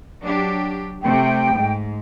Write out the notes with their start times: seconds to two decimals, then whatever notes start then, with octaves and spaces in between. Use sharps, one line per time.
0.23 F#3 D4 G4
1.03 C3 A3 G5
1.55 G#2